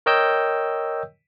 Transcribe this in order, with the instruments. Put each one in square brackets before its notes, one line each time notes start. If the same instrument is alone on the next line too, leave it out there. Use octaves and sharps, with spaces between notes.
[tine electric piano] A#4 C#5 D#5 G5 E6 G6